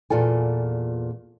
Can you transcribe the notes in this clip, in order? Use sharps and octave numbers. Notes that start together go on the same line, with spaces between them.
E2 A#2 F4 A4 G#5